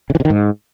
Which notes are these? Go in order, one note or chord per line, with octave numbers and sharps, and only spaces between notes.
C#3
E3
C3
D#3
G#2